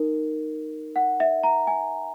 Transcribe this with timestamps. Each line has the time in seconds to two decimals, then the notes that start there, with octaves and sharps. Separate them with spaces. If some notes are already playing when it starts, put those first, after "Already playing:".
Already playing: D#4 A#4
0.96 F#5
1.20 E5
1.44 A#5
1.67 G#5